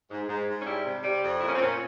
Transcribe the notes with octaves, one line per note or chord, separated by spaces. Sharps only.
G#2
G#2
G#2
C#4
G3 E4
C3
G3
F2
A#2 E4
C#4
C4
A#2 C#4